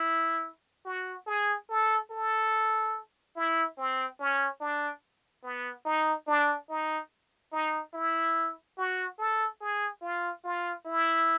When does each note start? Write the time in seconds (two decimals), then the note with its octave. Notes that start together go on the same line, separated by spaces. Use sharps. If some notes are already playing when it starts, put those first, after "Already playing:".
Already playing: E4
0.85 F#4
1.27 G#4
1.69 A4
2.11 A4
3.36 E4
3.78 C4
4.19 C#4
4.61 D4
5.43 B3
5.85 D#4
6.27 D4
6.69 D#4
7.52 D#4
7.93 E4
8.78 F#4
9.18 A4
9.61 G#4
10.02 F4
10.44 F4
10.85 E4